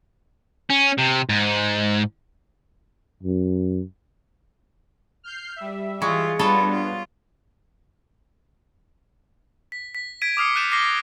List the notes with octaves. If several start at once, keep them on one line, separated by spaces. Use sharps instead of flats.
C#4
C3
G#2
F#2
F6 G6 C7
G3 E5
E3 G#3 F4 C#6
G3 B3 D4 F4 A4 C#5 D#5 B5
F4
B6
B6
G#6 B6 D7 D#7
D6 D#6 F6 C7 C#7
F#6 G6 A6 D#7 E7
D6 A#6 C7 G7